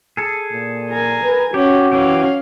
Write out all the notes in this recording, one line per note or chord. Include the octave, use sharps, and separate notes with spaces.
G#4 A4
A#2
A#4 G#5
B4
C#4 F#4 G4
E3 C#4 G4 F5